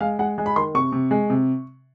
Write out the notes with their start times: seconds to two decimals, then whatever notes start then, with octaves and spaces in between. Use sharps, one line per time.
0.01 G#3 F5
0.19 G#3 F#5
0.38 G#3
0.46 B5
0.56 D#3 C6
0.75 C3 C#6
0.92 C3
1.11 G#3
1.30 C3